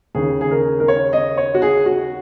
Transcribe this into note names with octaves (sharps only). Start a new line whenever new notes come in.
D#2 C#3 G#4
G#4
A#4
A#4
C#5
D#5
C#5
F#4
G#4
F#4